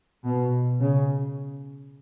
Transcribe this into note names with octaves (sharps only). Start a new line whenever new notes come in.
B2
C#3